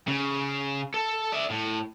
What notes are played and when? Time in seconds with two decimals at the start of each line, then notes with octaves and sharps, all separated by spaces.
0.08 C#3
0.94 A4
1.32 D5 E5
1.50 A2